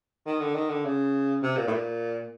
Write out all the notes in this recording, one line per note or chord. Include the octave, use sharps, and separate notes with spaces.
D#3
D3
D#3
D3
C#3
C3
A#2
A2
A#2